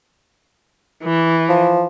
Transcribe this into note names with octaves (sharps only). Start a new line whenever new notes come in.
E3
F3